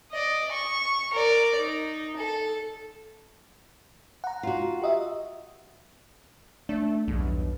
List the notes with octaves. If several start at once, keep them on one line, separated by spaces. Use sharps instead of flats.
D5 D#5
C#6
A#4 D5
D#4
A4
F#5 A#5
F4 F#4
G4 D#5 E5
A3 D4
B1 E2 G2